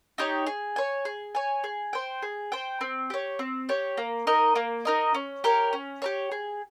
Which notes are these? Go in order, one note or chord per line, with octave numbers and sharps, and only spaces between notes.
D#4 G4 C#5
G#4
C#5 G#5
G#4
C#5 G#5
G#4
C5 G5
G#4
C5 G5
C4
G4 C#5
C4
G4 C#5
A#3
D#4 A#4 D#5
A#3
D#4 A#4 D#5
C#4
G4 A#4 C#5
C#4
G4 A#4 C#5
G#4